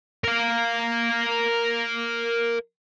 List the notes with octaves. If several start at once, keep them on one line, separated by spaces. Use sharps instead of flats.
A#4 F5